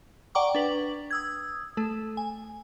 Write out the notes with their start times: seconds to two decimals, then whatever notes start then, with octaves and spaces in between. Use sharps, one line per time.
0.35 D5 F#5 G5 A#5 C#6 D6
0.55 D4 B4 F#7
1.11 D#6 E6 G#6
1.77 A3 A4
2.17 G#5